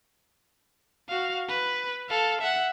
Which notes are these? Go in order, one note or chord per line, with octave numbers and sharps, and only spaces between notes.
F#4 F5
B4
A4 F5
E5 F#5